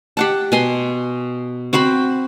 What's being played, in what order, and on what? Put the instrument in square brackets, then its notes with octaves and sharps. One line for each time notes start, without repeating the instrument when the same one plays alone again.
[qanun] G4 F#5 A5
B2 G#5 C6
C4 F#4 C5 B5